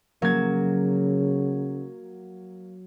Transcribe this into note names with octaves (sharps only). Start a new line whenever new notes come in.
C#3 F#3 A#3 G#6